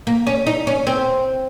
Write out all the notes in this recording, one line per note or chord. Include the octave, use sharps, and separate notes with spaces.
A#3
C#4
D#4
C#4
C4